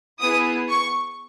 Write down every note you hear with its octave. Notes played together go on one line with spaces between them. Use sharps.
B3 E4 G#4 D#6
C#6